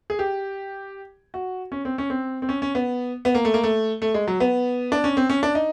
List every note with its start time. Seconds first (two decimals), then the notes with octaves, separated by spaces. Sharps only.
0.10 G#4
0.19 G4
1.34 F#4
1.72 C#4
1.85 C4
1.98 C#4
2.10 C4
2.42 C4
2.49 C#4
2.62 C#4
2.75 B3
3.25 B3
3.35 A#3
3.45 A3
3.54 A#3
3.64 A3
4.02 A3
4.14 G#3
4.27 F#3
4.40 B3
4.92 D4
5.04 C#4
5.17 C4
5.30 C#4
5.43 D4
5.55 D#4